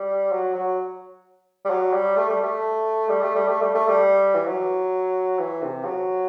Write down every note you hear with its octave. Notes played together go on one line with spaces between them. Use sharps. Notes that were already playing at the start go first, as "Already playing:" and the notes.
Already playing: G3
F#3
F#3
G3
F#3
G3
A3
G3
A3
G3
A3
G3
A3
G3
A3
G3
E3
F#3
E3
C3
F#3